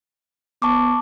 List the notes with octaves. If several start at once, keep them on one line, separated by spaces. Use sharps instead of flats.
B3 A5 C#6 D6